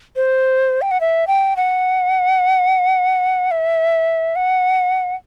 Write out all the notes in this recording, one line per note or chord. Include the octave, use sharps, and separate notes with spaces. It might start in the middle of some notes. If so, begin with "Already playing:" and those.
C5
G5
F#5
E5
G5
F#5
E5
F#5